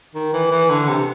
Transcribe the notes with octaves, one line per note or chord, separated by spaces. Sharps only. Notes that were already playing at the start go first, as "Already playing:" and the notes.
D#3
E3
E3
D3
C3